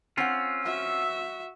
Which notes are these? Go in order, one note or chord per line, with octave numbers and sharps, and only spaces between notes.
C4 C#4 F4 F#5 E6
F#4 E5